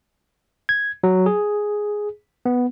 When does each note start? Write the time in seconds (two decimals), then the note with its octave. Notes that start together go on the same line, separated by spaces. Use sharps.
0.69 G#6
1.04 F#3
1.26 G#4
2.46 B3